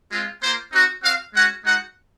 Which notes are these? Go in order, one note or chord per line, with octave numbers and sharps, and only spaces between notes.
G#3 C4 F4
A#3 F4 C5
C4 D#4 F#4
C4 F#4 F5
G#3 C#4 F#4 F#5
G#3 D#4 F#4 F#5